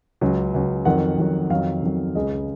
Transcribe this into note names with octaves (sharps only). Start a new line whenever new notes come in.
C#2 C#3 F#3
C#2 C#3 F#3
F2 D#3 F#3 F#5
F2 D#3 F#3
F2 D#3 F#3 F5
F2 D#3 F#3
C#2 C#3 G#3 D#5